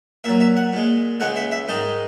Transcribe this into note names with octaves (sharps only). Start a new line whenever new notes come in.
A#2 F#3 E5
E5
F#5
A#2 G#3
C#2 C#3 G#3 F#5
E5
E5
G#2 D#3 G#3 D#5